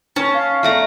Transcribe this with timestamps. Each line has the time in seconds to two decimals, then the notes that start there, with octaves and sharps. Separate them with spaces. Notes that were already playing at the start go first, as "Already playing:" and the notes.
0.16 C#4 A5
0.34 F5
0.63 A3 D5 A#5